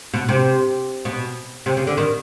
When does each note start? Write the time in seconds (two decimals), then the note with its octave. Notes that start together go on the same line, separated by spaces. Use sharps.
0.14 B2
0.29 C3
1.05 B2
1.66 C3
1.77 C#3
1.87 D3
1.97 D#3